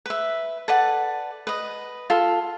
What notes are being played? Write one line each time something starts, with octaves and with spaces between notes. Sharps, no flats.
B4 E5
A4 B4 D5 F#5
B4 D#5
F4 A4